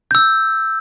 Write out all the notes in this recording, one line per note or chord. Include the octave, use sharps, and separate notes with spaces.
E6 G6